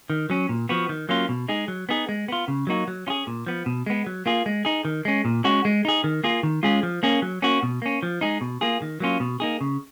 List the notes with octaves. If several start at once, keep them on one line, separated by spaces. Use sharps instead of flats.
D#3
F#3 C#4
A#2
F3 B3 F#4
D#3
F#3 A#3 C#4 F4
B2
G#3 D#4 G#4
F#3
B3 D#4 G#4
G#3
B3 F4
C#3
F#3 A#3 D#4 F#4
F#3
C#4 F4 G#4
A#2
F3 B3
B2
G#3 B3
F#3
A#3 F4 G#4
G#3
D#4 G#4
D#3
G#3 C#4
A#2
G#3 C#4 F#4
G#3
D#4 G#4
D#3
A#3 F4 G#4
D#3
G#3 C#4 F4 G#4
F3
A#3 C#4 G#4
F#3
A#3 C#4 F#4
B2
A#3 C#4
F3
G#3 D#4 G#4
B2
A#3 F4 G#4
D#3
F#3 A#3 C#4 F4
B2
A#3 D#4 G#4
C#3